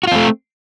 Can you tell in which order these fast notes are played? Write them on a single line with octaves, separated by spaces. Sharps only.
F#4 F4 C4 A3